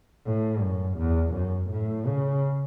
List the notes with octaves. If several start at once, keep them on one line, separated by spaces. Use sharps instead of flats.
A2
F#2
E2
F#2
A2
C#3